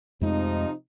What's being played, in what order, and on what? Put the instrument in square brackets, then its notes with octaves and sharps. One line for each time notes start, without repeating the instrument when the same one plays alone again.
[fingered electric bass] F2 G#3 A3 [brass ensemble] C3 F3 D#4